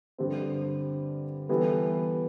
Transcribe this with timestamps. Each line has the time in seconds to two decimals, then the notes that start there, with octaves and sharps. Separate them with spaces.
0.18 G2 D3 G3 C4
1.49 E3 G3 B3 E4 A4